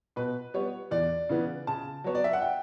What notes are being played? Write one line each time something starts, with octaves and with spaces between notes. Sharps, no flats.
B2 B4
G3 B3 C#5
E2 D5
C#3 E3 B3
C#3 A5
F#3 B3 C#5
D5
E5
F#5
G5